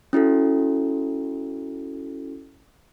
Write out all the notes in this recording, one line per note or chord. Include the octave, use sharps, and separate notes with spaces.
C#4 E4 F#4 A4